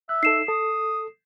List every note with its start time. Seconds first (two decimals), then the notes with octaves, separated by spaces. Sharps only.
0.09 E5 F#6
0.23 D#4 A4 C7 E7
0.48 A4 D#6